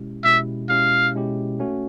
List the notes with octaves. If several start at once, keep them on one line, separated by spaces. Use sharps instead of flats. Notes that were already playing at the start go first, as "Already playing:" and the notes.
Already playing: B2 G#3 C#4 E4 G4
B2 G#3 C#4 E4 G4 E5
B2 G#3 C#4 E4 G4 F5
B2 G#3 C#4 E4 G4
A3 C#4 F#4